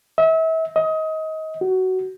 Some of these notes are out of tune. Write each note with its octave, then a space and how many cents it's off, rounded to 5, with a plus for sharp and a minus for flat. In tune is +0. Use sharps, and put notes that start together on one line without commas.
E5 -35
D#5 +25
F#4 +15